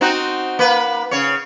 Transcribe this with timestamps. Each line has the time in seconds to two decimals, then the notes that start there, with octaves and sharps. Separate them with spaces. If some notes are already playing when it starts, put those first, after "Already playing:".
0.01 C4 D#4 F#4
0.59 A#3 B4
1.11 C#3 C#5